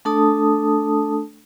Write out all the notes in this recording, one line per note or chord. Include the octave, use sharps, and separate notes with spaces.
A3 D4 A4 A5 D#6